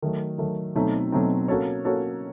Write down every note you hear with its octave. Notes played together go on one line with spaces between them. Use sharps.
D#3 F#3 A3
D#3 F#3 A3
B2 F#3 A3 C4 D#4
B2 F#3 A3 C4 D#4
A#3 C#4 F#4 A4 C#5
A#3 C#4 F#4 A4 C#5